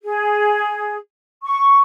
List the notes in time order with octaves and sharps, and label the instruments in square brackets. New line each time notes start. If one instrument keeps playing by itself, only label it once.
[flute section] G#4
C#6